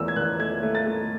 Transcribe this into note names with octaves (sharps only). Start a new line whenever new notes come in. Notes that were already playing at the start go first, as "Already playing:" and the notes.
Already playing: E2 A3 E6
G#6
E2 F#6
A3 G#6
A3
A6
A3